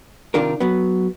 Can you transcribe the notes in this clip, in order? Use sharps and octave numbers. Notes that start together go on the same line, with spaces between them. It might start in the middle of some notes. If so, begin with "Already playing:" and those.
C3 D#3 D4 F4 A#4
F#3 B3